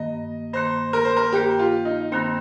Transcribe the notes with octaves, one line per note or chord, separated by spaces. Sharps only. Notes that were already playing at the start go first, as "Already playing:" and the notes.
Already playing: G2 D#3 A#3 D#5
G2 D#3 A#3 C5
A#4
C5
A#4
G2 D#3 A#3 G4
F4
D#4
G2 D#3 A#3 C4